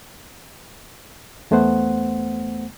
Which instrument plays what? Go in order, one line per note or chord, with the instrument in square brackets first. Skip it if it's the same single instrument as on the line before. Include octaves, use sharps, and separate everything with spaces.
[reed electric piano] E2 A3 B3 C5 F#5